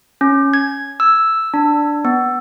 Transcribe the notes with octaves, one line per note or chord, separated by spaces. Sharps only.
C#4
G#6
E6
D4
B3